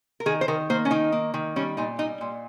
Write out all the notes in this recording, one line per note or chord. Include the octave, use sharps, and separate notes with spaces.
A#4
D#3 G#4
C5
D#3 A#4
A#3 C5
C#4
D#3 D#4
A#3
D#3
G3 C#4
A#2 D#4
G3 D#4
A#2